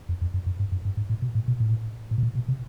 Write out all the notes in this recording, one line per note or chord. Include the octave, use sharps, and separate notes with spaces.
F2
F2
F#2
F#2
G2
F#2
G2
G#2
A2
B2
A2
B2
A2
A2
B2
A#2
B2
C3